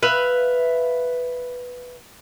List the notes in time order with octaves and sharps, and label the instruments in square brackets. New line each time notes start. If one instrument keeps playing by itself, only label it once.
[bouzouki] B4 E5 F5